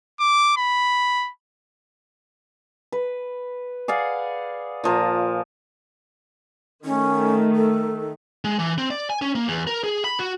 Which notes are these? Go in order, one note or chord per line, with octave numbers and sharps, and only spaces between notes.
D6
B5
B4
G#4 D5 F5 F#5
A#2 F3 A#5
D#3 A3 C#4
A4
G#3
E3
C4
D5
G#5
C#4
A#3
E2
A#4
G#4
B5
F#4